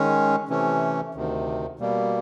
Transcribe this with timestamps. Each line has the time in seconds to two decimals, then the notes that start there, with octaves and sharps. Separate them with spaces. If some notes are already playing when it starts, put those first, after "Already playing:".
Already playing: D#3 G#3 C#4
0.49 C3 E3 A3 C#4
1.15 D2 C3 D#3
1.79 B2 G3 A#3